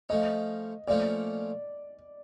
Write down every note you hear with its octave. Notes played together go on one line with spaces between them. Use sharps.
F3 A3 C#4 D#5
A#2 F3 A3 C#4 D5